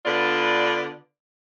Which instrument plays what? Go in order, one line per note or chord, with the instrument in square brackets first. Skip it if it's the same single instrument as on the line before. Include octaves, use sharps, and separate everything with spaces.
[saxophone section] D3 B3 D4 F4 B4 D5